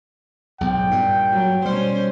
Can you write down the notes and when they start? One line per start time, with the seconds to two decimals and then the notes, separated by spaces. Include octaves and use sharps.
0.61 B1 G#2 G5
0.91 G2 A#2
1.32 F#3
1.65 B2 G3 C#4 C5